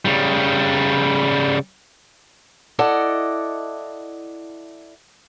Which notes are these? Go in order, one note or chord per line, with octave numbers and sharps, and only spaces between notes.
C#3 G3
E4 A4 D5 D#5 F#5